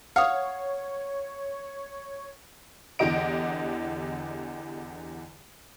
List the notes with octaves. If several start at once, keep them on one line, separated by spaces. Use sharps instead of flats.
C#5 F5 F#5 D#6
E2 D3 E3 G4 D#5 D7